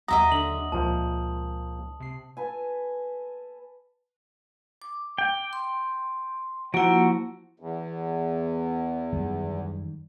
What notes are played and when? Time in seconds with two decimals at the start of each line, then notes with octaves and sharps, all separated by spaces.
0.08 D#2 F#3 D#5 E5 F#5 A#5 D#6
0.32 D3 F#7
0.72 C#2 A#2 F3 A5
2.00 C3 C7
2.37 A4 B4 G#5
4.82 D6
5.18 G5
5.53 C6
6.74 F3 A#3 E4 F#4
7.60 E2
9.13 F#2 D#3 G3